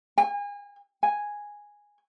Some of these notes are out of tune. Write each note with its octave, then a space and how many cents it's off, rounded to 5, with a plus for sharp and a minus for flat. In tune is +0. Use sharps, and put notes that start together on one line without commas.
G#5 -35
G#5 -5